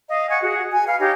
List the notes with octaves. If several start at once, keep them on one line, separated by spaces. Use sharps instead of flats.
D#5 F5
F#5 G#5 C#6
F#4 G#4
G#5
B4 F5
D#4 G4 C#5 D#5